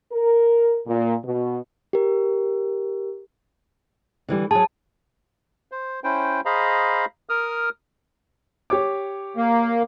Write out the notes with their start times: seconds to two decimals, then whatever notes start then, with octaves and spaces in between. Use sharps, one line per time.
0.12 A#4
0.87 A#2
1.24 B2
1.93 G4 A#4
4.29 D3 E3 G3
4.51 F#3 G#4 A5
5.72 C5
6.04 C#4 E4 C5 G5
6.45 G#4 C5 D#5 F5 A#5 B5
7.29 A#4 D#6 F6
8.70 G4 C#5 D6
9.37 A#3